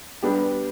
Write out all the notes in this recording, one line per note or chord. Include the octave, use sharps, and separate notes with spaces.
G3 B3 D4 G4